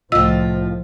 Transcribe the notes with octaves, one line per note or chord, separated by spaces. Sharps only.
C2 A2 F3 F4 D#5 E6